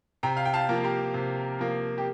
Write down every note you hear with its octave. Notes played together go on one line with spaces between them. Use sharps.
C3 G5 A#5
F5
G5
F5 A5
F3 A#3
G4 A#4
C3
F3 A#3
G4